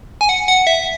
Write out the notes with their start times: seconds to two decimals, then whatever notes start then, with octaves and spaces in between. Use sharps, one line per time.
0.21 G#5
0.29 F#5
0.48 F#5
0.67 E5